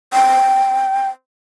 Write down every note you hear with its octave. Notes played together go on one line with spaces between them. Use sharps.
G5